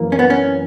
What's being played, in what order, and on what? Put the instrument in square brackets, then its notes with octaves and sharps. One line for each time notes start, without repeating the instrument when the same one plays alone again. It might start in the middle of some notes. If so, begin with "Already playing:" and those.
Already playing: [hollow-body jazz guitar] F#2 E3 A#3
C#4
B3
C#4